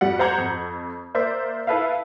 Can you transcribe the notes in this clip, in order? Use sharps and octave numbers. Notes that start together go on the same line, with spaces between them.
F2 G3 F#5
C5 F#5 A#5 G6 G#6
F2
A#3 A#4 C5 D5 E5
E4 A4 B4 E5 F5